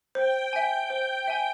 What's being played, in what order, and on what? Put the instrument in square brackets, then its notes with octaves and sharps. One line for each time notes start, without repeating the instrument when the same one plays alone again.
[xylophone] C5 [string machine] G5
[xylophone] E5 G#5
C5
E5 G#5